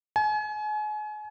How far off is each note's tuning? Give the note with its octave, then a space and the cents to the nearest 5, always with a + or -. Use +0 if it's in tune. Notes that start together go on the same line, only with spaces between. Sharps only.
G#5 +35